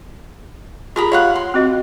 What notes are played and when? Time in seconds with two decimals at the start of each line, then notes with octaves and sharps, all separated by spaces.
0.96 F4 G4 G#4 A#4 A#5 B5
1.12 F4 C#5 F5 F#5
1.36 C6
1.54 C4 F#4 D#5